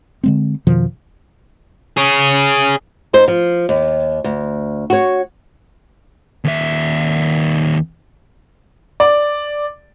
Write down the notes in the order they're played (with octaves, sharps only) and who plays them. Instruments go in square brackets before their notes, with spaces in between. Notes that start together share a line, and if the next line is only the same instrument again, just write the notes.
[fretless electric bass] D3 G#3 C4
F2 B2 D#3 F3
[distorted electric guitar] G#4 C#5
[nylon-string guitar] D#4 C5
F3
D#2
D2
F#4 C#5
[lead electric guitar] D#2 E5
[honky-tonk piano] D5